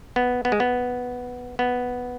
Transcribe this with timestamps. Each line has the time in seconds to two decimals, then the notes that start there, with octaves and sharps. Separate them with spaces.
0.16 B3
0.45 B3
0.52 G#3
0.60 B3
1.59 B3